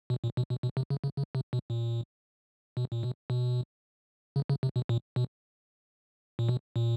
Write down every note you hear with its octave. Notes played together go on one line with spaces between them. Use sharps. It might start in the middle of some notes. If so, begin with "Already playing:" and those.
B2
A#2
B2
B2
B2
C3
C#3
C#3
C#3
C3
B2
A#2
B2
A#2
B2
B2
C#3
C#3
C3
B2
A#2
B2
A#2
B2
A#2